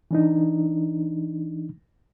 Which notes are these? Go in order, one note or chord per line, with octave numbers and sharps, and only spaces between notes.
E3 D4 D#4